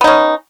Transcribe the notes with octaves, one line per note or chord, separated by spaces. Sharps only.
B3 C#4 D#4